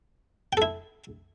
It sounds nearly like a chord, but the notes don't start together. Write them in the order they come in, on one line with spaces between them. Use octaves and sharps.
G5 A4 E4